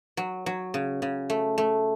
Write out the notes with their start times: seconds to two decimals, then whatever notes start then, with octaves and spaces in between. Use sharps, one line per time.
0.17 F#3
0.46 F#3
0.74 C#3
1.02 C#3
1.30 A3
1.58 A3